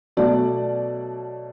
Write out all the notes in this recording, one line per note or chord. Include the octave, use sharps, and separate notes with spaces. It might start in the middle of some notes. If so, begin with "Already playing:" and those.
B2 F#3 A3 D5